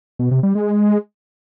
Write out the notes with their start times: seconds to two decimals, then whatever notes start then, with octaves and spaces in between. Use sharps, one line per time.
0.19 B2
0.31 C3
0.43 G3
0.55 G#3